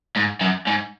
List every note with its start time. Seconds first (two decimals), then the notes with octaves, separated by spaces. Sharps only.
0.17 G#2
0.41 F#2
0.67 G#2